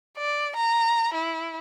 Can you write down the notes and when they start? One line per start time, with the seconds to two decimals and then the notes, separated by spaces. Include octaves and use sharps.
0.18 D5
0.56 A#5
1.14 E4